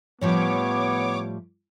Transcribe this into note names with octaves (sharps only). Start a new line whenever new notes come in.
A2 F3 G3 B3 C#5 D6